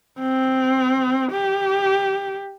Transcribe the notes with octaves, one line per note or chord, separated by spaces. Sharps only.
C4
G4